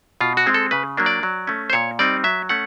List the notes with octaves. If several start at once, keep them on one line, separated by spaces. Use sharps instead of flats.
B2 F4
F#4
G#3 C4
A4
C#3 B4
F#3 A#3 D4
D5
F#3
A3 C#4
C5
A#2 C#5
G3 C4 D#4 D5
F#3 E5
A3 C#4 F#5